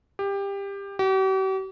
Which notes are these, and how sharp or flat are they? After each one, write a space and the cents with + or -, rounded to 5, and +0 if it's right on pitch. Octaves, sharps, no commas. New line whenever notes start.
G4 +20
G4 -45